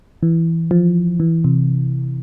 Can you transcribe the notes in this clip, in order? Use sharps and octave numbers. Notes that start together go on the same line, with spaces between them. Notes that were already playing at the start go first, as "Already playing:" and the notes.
E3
F3
E3
C3